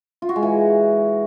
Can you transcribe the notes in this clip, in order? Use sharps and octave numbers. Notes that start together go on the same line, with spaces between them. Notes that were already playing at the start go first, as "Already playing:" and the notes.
F4
F#4
G#3
E3